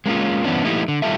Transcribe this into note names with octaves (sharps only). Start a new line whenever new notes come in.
G#3 A#3 C#4 F4
G2 E3 B3 C#4 D4
F3 A3 A#3 D#4 E4 G4
D3
D#3 G3 E4 F4 A4 E5